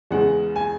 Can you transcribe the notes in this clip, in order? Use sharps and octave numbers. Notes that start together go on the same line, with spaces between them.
E2 C#3 G#3 F#5
G#5